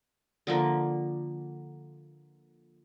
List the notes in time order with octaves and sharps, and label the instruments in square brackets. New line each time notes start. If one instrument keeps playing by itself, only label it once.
[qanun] D3 F3 A#3